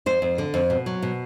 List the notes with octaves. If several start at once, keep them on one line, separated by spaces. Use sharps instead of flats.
F2 C5
F2
D3
F2
B2
F#3
B2